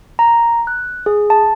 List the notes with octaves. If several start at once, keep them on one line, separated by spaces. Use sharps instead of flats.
A#5
F#6
G#4
A5